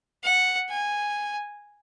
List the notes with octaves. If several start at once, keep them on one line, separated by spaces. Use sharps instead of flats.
F#5
G#5